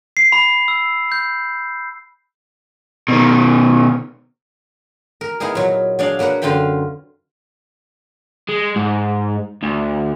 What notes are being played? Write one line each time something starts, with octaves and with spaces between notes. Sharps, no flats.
C7
B5
E6
G6
B2 D#3
A#4
B3 D#4 E4 G#4 A#4
A#2 F#3
F#3 D4 G#4 D5 F5
F#3 A#3 B4 F#5
F#2 D3 F4 F5 G5 B5
G#3
G#2
D2